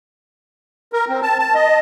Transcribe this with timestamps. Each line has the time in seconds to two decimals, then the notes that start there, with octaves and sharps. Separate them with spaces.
0.93 A#4
1.09 C4
1.22 A5
1.39 A5
1.54 D#5